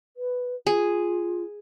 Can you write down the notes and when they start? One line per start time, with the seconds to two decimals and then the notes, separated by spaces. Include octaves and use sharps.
0.17 B4
0.67 F4 G#4